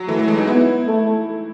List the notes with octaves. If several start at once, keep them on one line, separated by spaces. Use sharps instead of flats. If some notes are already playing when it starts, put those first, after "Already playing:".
Already playing: F#3
E3 A3
E3
G#3
D#4
B3 E4
A3